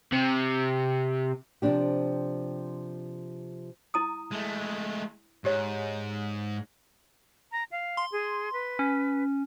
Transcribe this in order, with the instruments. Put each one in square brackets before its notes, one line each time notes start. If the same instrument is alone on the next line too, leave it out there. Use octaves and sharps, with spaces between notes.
[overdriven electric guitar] C3
[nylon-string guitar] C3 F3 C4 D4 G4
[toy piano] E4 A#5 D#6
[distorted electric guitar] G#3 A3
[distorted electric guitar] G#2 [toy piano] G4 C#5
[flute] A#5
F5
[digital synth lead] C6
[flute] G#4
B4
[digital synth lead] C#4